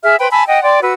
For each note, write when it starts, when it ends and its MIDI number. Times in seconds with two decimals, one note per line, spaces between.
0.04 0.15 68
0.04 0.15 76
0.04 0.15 89
0.19 0.28 71
0.19 0.28 72
0.19 0.28 79
0.19 0.28 83
0.31 0.44 80
0.31 0.44 81
0.31 0.44 83
0.31 0.44 88
0.48 0.62 75
0.48 0.62 78
0.48 0.62 79
0.64 0.79 74
0.64 0.79 79
0.64 0.79 84
0.82 0.94 66
0.82 0.94 71
0.82 0.94 88